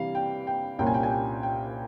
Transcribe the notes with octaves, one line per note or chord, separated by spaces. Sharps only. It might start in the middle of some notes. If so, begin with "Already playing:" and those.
Already playing: C3 E3 G3 F5
G5
G5
C2 A#2 G3 A#3 C#4 G5
G#5
G5
G#5
G5
G5